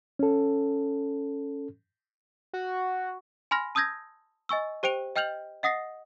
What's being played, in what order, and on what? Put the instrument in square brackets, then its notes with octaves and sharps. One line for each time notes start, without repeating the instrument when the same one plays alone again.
[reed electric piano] C#4 A4
[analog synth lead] F#4
[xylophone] G#5 B5 C6 F6 A#6
A5 D#6 E6 G6 G#6 A#6
D#5 G#5 C#6 E6
G4 C5 G5 D7 F7
D#5 G5 F6 G6 F7 F#7
D#5 F#5 D#6 A#6 C7